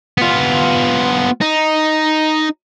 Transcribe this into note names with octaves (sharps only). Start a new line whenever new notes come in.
B3 F4
D#4